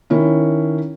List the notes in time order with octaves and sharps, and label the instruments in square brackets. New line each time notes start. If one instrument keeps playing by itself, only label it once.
[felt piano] D#3 C#4 E4